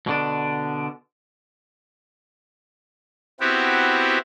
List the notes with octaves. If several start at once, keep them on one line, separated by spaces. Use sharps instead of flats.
B2 D3 D4
B3 C4 E4 F#4 G4